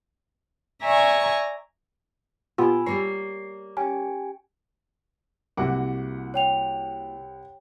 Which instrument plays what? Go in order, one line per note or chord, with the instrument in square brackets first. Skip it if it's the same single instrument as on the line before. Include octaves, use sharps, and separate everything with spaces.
[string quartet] D5 E5 G#5 A#5 C#6
[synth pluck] A#2 B3 F4 [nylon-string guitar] G4 [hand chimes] G#5 B5 E6
[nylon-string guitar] G3 A#3 C#5 [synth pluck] A#5 [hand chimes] C7
[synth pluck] C#4 [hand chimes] G4 G5 G#5
[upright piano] C2 F#5 D6 [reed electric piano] A#3 E4 F#4
[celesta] C#5 G5 F7